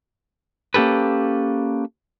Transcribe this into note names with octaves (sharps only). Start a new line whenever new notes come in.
A#3 C#4 G4 A4 B4